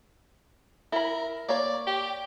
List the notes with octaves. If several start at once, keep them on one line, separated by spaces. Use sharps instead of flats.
E4 A#4 B5
A#3 C#5 D5
G4